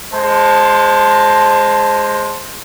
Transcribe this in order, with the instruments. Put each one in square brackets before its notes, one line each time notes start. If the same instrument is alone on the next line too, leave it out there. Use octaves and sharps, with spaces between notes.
[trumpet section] G#3 C5 A5